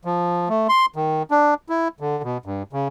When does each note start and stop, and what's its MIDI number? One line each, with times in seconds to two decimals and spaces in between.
0.05 0.49 53
0.49 0.67 57
0.69 0.86 84
0.96 1.23 51
1.31 1.54 62
1.69 1.88 64
2.00 2.22 50
2.23 2.38 47
2.45 2.63 43
2.73 2.88 49